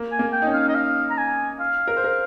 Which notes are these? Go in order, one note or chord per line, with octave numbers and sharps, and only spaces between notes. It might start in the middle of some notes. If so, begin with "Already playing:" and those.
Already playing: A#3
G#5
A#3
G5
D#4
C#4
F5
D#5
F5
A#5
G#5
F5
A#4
C5
A#4